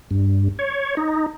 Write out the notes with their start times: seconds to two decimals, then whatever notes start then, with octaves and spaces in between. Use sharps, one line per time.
0.11 G2
0.59 C#5
0.97 D#4